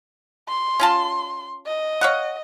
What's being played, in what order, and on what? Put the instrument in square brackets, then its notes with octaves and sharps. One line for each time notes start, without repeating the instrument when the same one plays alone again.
[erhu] C6
[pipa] C#4 F4 A5
[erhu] D#5
[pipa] C#5 F5 F#5